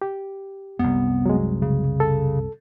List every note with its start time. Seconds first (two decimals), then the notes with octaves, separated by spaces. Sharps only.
0.02 G4
0.79 C2 F#2 B3
1.26 F#3 G#3
1.62 C#3
2.00 A4